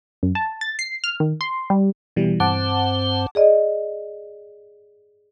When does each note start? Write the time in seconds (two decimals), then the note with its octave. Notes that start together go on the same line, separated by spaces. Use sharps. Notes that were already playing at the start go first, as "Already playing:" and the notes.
0.23 F#2
0.35 A5
0.61 A6
0.79 C7
1.04 F6
1.20 D#3
1.41 C6
1.70 G3
2.16 B2 E3 G3
2.40 G2 C4 C5 F#5 A5 D6
3.35 G#4 D5 D#5